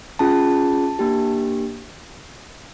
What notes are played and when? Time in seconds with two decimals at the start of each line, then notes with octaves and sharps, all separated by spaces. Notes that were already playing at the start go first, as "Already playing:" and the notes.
0.19 C#4 F4 G#4 A5
0.99 A#3 D4 G4